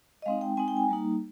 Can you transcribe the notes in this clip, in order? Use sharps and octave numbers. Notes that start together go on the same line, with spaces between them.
D#5
G#3 C4 D#4 F5
G5
G#3 C4 D#4 G#5
G5
G#5
G3 A#3 D#4